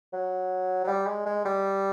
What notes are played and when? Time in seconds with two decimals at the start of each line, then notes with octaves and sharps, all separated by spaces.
0.13 F#3
0.84 F#3
0.88 G3
1.07 G#3
1.26 G#3
1.45 G3